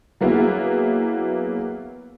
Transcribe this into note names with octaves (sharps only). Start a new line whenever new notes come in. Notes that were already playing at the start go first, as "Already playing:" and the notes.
F#3 A#3 B3 E4 G#4